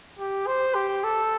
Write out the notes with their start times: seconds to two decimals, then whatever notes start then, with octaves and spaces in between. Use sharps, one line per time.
0.19 G4
0.47 C5
0.75 G4
1.04 A4